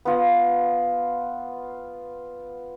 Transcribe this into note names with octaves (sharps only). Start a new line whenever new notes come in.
B3 F4 F#5